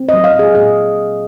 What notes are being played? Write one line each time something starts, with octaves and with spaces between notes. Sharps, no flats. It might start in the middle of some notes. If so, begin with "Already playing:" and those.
Already playing: C4
F#3 D#5
F5
A#2 G#4
A#2 G#4